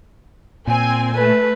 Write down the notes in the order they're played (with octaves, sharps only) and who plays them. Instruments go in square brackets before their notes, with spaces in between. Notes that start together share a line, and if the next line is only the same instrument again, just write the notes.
[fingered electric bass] A#2 [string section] C4 G#5
[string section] A3 [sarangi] B4